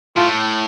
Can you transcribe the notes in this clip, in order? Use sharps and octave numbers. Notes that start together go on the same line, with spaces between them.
A2 F4